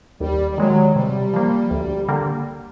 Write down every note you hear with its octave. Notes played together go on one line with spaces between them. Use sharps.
D#2 G3
G3
D#3 F#3 G#3
C3 G3
F3 A#3
D2
D3 G3 A#3